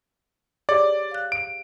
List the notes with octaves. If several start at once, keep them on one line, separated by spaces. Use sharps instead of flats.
G4 G#4 C#5 D5
F5 F#6
D7